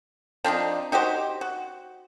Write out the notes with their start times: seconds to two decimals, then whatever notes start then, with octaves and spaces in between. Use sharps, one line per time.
0.44 F3 C4 D4 D#4
0.92 D#4 F#4 G4 C5
1.41 F#4